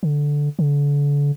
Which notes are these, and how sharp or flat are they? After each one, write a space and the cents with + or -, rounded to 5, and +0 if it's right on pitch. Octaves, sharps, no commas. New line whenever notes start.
D3 -5
D3 -35